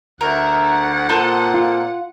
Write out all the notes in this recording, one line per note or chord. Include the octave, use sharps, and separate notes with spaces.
D2 A#4 E5 F#5
F#5
A#2 C4 A4 D#5
F4